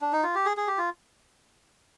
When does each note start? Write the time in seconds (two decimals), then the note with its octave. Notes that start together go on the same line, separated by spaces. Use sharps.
0.01 D4
0.13 D#4
0.23 F4
0.35 G4
0.46 G#4
0.57 G#4
0.67 G4
0.78 F4